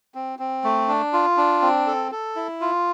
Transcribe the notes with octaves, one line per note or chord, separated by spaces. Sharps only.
C4
C4
A3
D4
F4
D4
C4
A4
A4
E4
F4